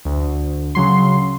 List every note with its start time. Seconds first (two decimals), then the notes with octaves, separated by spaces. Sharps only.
0.05 D2
0.75 C#3 F#3 C6